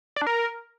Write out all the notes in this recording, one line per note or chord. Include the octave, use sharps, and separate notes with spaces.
D5
D4
A#4